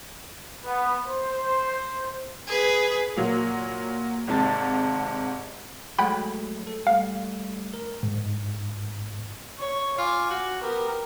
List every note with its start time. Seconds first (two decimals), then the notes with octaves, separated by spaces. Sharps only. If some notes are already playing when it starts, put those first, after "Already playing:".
0.65 B3
1.07 C5
2.46 G#4 B4
3.17 A#2 F#3 A#3
4.28 G#1 G#2 C3 A5 A6
5.98 F#3 G#3 A3 F#5 G5 B5
6.67 A4
6.87 G3 A3 F5
7.74 A#4
8.03 G#2
9.59 C#5
9.98 F4 G#5 D6
10.30 F#4
10.61 B3 G4 A#4